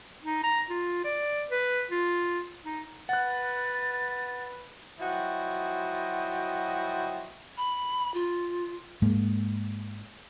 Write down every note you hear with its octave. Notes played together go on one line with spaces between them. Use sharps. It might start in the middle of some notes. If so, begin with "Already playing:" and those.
D#4
A#5
F4
D5
B4
F4
D#4
B4 F#5 F#6 A6
F3 F#3 E4 F#4 D#5 G5
B5
F4
G#2 G#3 A#3